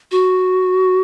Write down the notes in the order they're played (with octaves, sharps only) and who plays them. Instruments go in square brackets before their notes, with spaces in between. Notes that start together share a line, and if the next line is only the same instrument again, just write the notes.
[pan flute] F#4